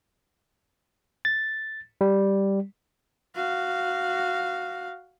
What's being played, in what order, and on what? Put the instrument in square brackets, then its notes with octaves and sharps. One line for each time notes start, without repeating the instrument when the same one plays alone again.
[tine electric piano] A6
G3
[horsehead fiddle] F#4 F5